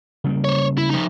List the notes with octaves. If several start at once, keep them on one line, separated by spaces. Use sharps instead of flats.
C#3 G3 A#3
C5 C#5
E4
F3 D#4